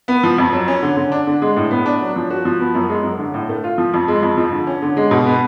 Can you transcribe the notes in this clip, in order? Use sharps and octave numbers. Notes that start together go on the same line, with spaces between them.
B3
F3
F2
F#3
C#4
D3
D3
D4
D3
G#3
A2
B3
D4
F#3
F3
F#4
F3
B3
F#2
G#3
F#2
D3
A2
A3
F4
F3
F2
G#3
F2
F3
D3
C#4
D3
G#3
B2
B3